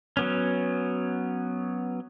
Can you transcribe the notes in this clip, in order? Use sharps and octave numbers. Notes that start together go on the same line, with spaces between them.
F#3 B3 C#4